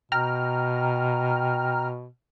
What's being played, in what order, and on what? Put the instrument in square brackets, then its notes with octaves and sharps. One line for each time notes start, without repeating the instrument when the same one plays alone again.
[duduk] B2 [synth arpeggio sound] G5 A#5 F6